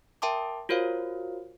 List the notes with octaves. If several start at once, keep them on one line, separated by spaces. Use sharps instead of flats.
A#4 E5 G5 A5 C6 D6
F4 F#4 A#4 C5 C#5 F5